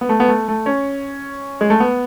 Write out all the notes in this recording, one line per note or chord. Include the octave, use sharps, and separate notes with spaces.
B3
A3
B3
A3
A3
C#4
G#3
A3
B3